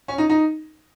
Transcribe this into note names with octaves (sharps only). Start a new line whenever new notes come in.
C#4
D#4
D#4